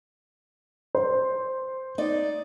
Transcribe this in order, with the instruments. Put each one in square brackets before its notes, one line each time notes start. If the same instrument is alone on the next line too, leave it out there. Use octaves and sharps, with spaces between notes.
[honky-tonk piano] C5
[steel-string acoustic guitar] D#4 D5